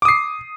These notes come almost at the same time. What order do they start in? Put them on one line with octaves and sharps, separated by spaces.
D6 D#6 C7